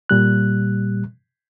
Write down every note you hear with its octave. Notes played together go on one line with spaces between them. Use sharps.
A#2 G3 F#6